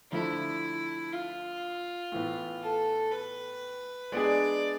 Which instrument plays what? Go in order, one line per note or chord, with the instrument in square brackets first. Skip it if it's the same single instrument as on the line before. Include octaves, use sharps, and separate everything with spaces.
[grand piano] D3 F3 A3 [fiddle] E4
[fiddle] F4
[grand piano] A2 E3 B3
[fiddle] A4
B4
[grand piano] G#3 B3 D4 G#4 [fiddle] D5